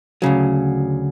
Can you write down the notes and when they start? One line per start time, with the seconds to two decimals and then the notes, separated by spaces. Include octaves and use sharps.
0.22 D2 C#3 F#3